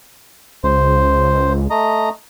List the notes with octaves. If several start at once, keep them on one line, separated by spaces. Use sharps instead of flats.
C#2 C5
A3 D#5 A#5